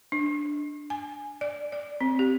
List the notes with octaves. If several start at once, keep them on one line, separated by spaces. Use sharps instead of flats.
D4
G#5
D5
D5
C4
G4